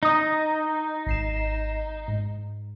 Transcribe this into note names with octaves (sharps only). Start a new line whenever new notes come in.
D#4 A#5 D#6
G#1 C7 E7
G#2